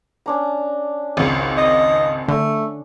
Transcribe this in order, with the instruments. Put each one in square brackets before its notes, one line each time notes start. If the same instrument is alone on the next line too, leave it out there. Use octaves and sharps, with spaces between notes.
[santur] C#4 D4 A#5
[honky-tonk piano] G#1 C#2 [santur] F#5 A#5
[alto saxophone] D#5
[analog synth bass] D3 [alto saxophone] A3